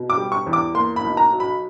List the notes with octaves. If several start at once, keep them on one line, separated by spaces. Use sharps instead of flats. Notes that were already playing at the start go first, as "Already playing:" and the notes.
Already playing: B2
D6
G3
C#6
E2
D6
A#3 C6
B5
B1
A#5
F#3
B5